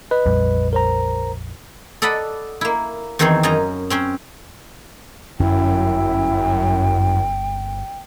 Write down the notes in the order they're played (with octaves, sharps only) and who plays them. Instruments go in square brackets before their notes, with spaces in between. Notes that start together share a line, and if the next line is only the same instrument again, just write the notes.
[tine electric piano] B4 D#5
[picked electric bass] A#1 F2 G3
[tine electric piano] A#4 C5 A#5
[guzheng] A4 D5 D#5 F#5 B5
A#3 E4
E2 D#3 E3 C4 C5 C#5
F#2 C#4 D#5 A#5
C4 C#4 C5
[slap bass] G1 C#4 [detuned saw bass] F#2 [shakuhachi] E4 [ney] G5